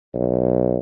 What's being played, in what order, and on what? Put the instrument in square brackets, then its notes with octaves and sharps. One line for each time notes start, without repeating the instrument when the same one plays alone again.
[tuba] B1